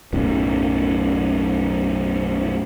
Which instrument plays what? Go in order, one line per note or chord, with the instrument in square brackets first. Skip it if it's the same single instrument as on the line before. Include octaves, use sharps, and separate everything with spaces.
[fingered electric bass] B1 F#2 A2